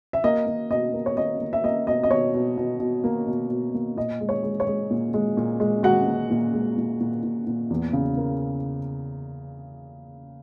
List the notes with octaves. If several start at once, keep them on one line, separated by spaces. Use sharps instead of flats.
E5
A#3 D#5
A#3
B2 D#5
A#3
C#5
A#3 D#5
A#3
E5
A#3 D#5
B2 D#5
D#5
B2 C#5
B2
B2
B2
A#3
B2
B2
A#3
A#2 D#5
G#3
C#5
G#3
C#5
G#3
A#2
G#3
A#2
G#3
G#3 F#4 F#5
A#2
A#2
G#3
A#2
A#2
A#2
A#2
E2
C#3
A#3